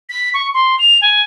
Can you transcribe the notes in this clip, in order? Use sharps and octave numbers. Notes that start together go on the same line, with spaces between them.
B6
C#6
C6
F7
G#5